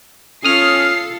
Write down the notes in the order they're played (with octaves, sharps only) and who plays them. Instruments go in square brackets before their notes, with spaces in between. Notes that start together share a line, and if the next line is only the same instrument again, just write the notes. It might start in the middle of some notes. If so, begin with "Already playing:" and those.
[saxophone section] C#4 [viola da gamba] F4 A4 [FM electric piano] D#6 F6 [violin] C7